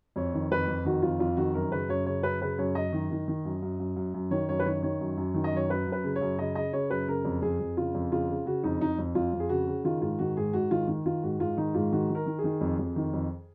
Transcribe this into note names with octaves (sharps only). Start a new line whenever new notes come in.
F2 C#5
D#3
F2 B4
F2
D#3 F#4
F2 F4
F2 F4
D#3 F#4
F#2 A#4
C#3 B4
F#2 C#5
C#3 C#5
F#2 B4
C#3 B4
F#2 C#5
F#2 D#5
D#3
D#3
D#3
F#2
F#2
F#2
F#2
F#2
D#3 C#5
F#2 C#5
B4
D#3 C#5
D#3 C#5
F#2
F#2
D#3
D#5
F#2 C#5
F#2 B4
F#2
B4
C#3
C#5
F#2
C#3 D#5
C#3 D#5
C#3 C#5
F#2 B4
C#3 A#4
F2
F2 G#4
F2
C#3 F4
F2
C#3 F4
C#3
C#3 F#4
F2 D#4
F2 D#4
F2
F2 F4
F2
G#4
C#3 F#4
C#3
D#3 F4
G#2 F4
D#3 F#4
G#2 G#4
G#2 F#4
D#3 F4
D#3
D#3 F4
G#2 F#4
G#2 F4
D#3 D#4
G#2 F4
D#3 F#4
D#3
A#4
D#3
G#4
D#3
F2
F2
D#3
F2